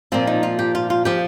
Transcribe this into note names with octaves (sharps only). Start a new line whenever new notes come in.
A#2 F3 C4
D#4
F4
G4
F4
F4
F3 G4